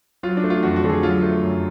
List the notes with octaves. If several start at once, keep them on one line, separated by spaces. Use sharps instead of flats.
F#3 F4
D4
A3
F4
F2 F#4
F#4
D3 A4
G#4
F#3 F4
A3
F#2